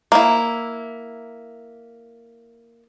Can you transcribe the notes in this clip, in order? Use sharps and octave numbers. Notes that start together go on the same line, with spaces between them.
A#3 E4